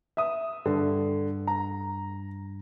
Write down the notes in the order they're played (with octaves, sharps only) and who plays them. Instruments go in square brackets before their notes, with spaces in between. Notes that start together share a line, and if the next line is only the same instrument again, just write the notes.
[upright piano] E5 D#6
[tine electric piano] G2 [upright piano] D3
[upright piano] A#5